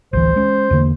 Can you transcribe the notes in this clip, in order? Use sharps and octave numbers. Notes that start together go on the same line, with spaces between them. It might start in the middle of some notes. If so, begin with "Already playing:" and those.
A1 D2 E3 C5
G#3 C#4
E2 D3 A#3